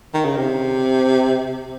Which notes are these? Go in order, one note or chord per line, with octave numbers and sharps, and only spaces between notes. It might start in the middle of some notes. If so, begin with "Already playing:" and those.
D#3
C#3
C3